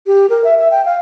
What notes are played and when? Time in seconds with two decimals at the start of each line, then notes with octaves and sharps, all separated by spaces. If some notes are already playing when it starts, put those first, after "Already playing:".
0.07 G4
0.30 A#4
0.44 E5
0.59 E5
0.71 G5
0.85 F5